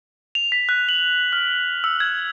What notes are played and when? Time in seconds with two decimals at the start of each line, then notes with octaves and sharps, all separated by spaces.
0.35 F7
0.52 B6
0.69 F#6
0.89 F#7
1.33 F6
1.84 E6
2.00 G#6